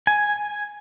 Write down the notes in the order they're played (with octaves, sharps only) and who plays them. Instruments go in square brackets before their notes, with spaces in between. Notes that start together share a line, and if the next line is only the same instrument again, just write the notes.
[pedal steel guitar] G#5